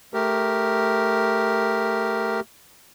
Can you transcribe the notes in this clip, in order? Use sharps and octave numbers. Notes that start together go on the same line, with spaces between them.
A3 G4 A#4